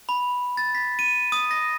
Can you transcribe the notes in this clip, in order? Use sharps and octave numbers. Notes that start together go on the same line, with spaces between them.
B5
A6
B6
D#7
D#6
A#6